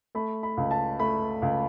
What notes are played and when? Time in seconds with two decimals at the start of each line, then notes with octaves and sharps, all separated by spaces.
0.15 A3 B5
0.43 B5
0.57 C#2
0.71 A5
0.99 A3 B5
1.42 C#2